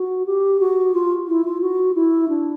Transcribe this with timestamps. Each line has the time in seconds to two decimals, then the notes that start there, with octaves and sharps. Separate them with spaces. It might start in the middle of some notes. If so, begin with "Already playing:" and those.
Already playing: F#4
0.26 G4
0.60 F#4
0.94 F4
1.28 E4
1.45 F4
1.61 F#4
1.95 E4
2.28 D4